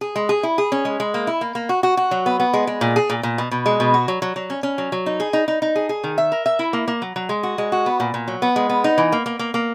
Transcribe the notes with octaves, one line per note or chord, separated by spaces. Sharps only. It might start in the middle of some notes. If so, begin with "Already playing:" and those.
G#4
G#3
G#4
E4
G#4
C#4
G#3
G#3
A#3
E4
A#3
A#3
F#4
F#4
F#4
F#3
B3
B3
G#3
G#3
A#2
G#4
A#2
A#2
B2
B2
G#3
B2
F#4
F#3
F#3
F#3
C#4
C#4
F#3
F#3
D#4
G#4
D#4
D#4
D#4
G#4
G#4
D#3
E5
A#4
E5
E4
A#3
A#3
F#3
F#3
G#3
F#4
G#3
F#4
B3
A#2
A#2
F#3
B3
G#3
B3
D#4
E3
A#3
A#3
A#3
A#3